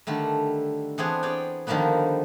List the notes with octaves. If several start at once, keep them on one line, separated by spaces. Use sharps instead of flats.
D3 D#3 G3 A3
E3 B3 C4 D4 G#4 C#5
G#4 C#5 D5 G5
D3 D#3 F3 G3 A#3 B3